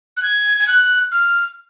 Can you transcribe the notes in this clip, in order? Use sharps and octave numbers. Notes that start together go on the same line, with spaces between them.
F#6
G#6
G#6
F#6
F6